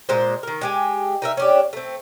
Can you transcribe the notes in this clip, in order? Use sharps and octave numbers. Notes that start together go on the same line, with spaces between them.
A#2 G#3 C5
D#3 A#4
G#3 G4 G#5
D#4 A#4 E5
C#4 D4 G4
A3 C4